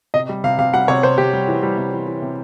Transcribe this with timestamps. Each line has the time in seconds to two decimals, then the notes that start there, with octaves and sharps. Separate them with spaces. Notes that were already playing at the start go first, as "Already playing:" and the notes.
0.14 C3 D#5
0.29 G3
0.44 C3 F5
0.59 C3 F5
0.73 G3 F#5
0.88 C3 C#5
1.03 C3 C5
1.18 C3 G4
1.33 G3
1.48 E3
1.63 G3
1.78 C3
1.92 E3
2.07 E3
2.22 C3